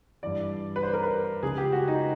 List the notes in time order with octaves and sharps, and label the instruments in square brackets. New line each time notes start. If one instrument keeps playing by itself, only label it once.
[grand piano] G2 E3 D5
B4
C5
A#4
B4
C#2 C#3 F3 G#4
G4
F#4
D#4